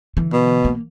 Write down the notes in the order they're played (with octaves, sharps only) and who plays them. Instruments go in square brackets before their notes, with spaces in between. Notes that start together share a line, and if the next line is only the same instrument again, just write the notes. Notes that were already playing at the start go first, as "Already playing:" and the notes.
[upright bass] D3 E3
[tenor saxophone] B2
[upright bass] A#3